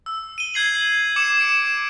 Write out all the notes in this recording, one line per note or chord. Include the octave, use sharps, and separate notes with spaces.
E6
D#7 G7
G6 G#6 C7 F#7
D6 C#7 E7
D7